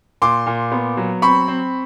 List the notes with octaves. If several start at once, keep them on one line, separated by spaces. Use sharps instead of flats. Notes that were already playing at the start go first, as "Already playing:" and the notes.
A#2 C6 D6
A#2
B3
F#3
C4 B5 C#6
C4